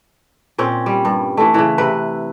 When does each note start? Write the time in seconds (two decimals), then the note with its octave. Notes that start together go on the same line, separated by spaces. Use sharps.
0.58 A#2 C4 C#4
0.86 G3
1.05 G2
1.37 E3 A3
1.54 C#3 E3
1.78 C3 B4